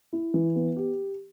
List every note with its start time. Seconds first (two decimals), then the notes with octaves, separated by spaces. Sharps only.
0.13 E4
0.34 E3
0.55 B3
0.77 G4